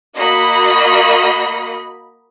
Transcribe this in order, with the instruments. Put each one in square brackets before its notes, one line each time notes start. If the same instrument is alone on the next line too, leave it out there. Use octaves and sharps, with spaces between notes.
[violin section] A#3 F#4 D#5 B5